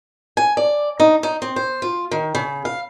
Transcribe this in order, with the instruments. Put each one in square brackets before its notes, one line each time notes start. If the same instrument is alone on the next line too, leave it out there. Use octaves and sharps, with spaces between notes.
[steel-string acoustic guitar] G#5
D5
D#4
D#4
C4
C5
F4
D#3
C#3
F5